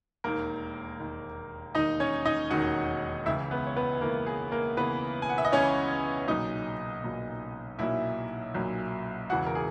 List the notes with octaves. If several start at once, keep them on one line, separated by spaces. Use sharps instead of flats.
E1 D#2 D#3 A#3 A#4
E1 D#2 D#3
E1 D#2 D#3 D#4 D#5
C#4 C#5
D#4 D#5
E1 D#2 D#3 F#4 F#5
C#2 C#3 E3 E4 E5
B3 B4
C#5
B3 B4
C#2 C#3 E3 A#3 A#4
G#4
A#3 A#4
C#2 C#3 E3 B3 B4
G#5
F#5
E5
D#5
C#2 C#3 E3 C#4 C#5
B1 A#2 F#3 D#4 D#5
B1 A#2 F#3
B1 A#2 F#3 E4 E5
B1 A#2 F#3
E1 E2 C#3 E3 F#4 F#5
A#4
G#4